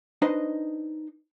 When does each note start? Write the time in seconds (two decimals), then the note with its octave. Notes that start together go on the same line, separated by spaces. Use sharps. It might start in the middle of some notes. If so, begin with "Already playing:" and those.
0.22 D4 D#4 B4 C5 D#5